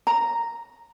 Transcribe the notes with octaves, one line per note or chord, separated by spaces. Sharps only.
A#5